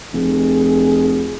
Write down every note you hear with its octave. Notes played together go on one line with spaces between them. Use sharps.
F1 G#4